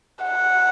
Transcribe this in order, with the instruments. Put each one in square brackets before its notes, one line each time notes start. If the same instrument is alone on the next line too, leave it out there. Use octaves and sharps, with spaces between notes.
[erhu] F#5